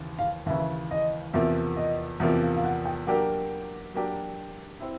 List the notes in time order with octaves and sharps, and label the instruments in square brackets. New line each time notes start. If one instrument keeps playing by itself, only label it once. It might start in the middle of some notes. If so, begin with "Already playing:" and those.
Already playing: [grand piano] D#2 C#3 E3
[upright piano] F5
[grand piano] D#2 C#3 E3 [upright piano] E5
[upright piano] D#5
[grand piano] E2 C3 F3 A#3 [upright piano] E5
[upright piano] D#5
[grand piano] E2 C3 F3 A#3 [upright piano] E5
[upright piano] F5
F5
F#5
G5
[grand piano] F#3 A#3 D4 G4 A#4 [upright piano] F#5
[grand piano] F#3 A#3 D4 G4 A#4
C4 E4